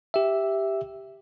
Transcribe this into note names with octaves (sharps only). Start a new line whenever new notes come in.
G4 E5